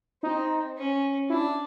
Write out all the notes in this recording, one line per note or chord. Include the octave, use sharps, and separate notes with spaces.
C4 D#4
C#4
D4 E4